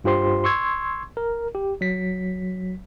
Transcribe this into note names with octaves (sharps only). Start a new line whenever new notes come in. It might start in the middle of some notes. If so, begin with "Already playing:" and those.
G2 F4 G4 C5 C6
C6 C#6 E6 G#6
A#4
G4
F#3 B6